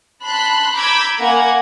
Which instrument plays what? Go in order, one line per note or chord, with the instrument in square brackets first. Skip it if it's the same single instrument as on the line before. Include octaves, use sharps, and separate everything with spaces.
[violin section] A5 B5 C6 F#6
A#5 B5 D6 E6 G6 G#6
A#3 F#5 G#5 G#6